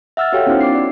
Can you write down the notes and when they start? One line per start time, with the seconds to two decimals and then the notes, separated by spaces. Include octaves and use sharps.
0.17 E5 F#5 E6 F6 A6
0.32 F#4 G4 A4 C#5 F5 G5
0.46 B3 C#4 D#4 E4 F#4 C5
0.61 D6 C7
0.75 D5